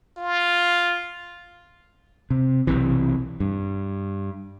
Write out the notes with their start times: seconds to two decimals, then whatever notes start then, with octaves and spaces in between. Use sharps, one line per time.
0.17 F4
2.30 C3
2.67 B1 C3 E3
3.40 G2